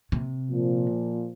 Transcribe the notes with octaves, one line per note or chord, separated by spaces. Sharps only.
C3
A#2 F3